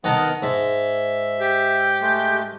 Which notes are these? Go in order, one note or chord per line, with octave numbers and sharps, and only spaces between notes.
D#3 B3 A4 A#4 D#5 F#5
G#2 E5
G4
G#3 A3